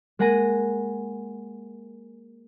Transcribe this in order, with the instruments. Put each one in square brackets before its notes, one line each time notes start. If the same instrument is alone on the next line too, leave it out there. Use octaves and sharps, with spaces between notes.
[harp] G#3 A#3 F#5 G#5 A#5 D#7